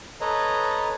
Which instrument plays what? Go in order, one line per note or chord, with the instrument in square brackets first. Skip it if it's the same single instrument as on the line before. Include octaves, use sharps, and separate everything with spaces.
[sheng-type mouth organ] A4 B4 C#5 D#5 A#5